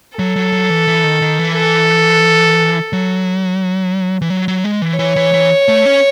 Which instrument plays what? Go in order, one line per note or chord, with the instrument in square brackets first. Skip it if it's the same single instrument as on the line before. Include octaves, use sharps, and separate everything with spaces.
[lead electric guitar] F#3 [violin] A4
[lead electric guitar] F#3
F#3
E3
E3
D#3
D#3
E3
[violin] A4
[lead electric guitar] F#3
E3
F#3
F#3
G#3
E3
[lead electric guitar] E3 [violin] C#5
[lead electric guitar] E3
E3
A3
C#4